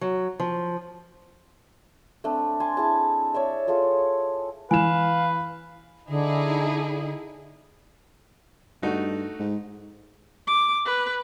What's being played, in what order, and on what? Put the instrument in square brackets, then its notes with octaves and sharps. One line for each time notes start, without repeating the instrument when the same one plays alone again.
[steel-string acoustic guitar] F#3
F3
[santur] A3 C4 D4
G#5 A5 C6
E4 G#4 A5
C#5 D5 E5
F4 G#4 A4 D#6
[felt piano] E3 E7 [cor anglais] B4 [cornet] F5 [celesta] G#5
[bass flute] D3 [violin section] D#4 E4 G#4
[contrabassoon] G2 [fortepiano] A3 D#4 F#4
[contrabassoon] G#2
[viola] D6
B4